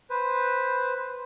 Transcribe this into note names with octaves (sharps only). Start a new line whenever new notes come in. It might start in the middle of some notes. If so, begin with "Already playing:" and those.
B4 C5